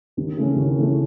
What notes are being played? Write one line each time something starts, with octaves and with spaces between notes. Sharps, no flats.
D#2
C#3 E3 A3 C#4
D#2
C#3 E3 A3 C#4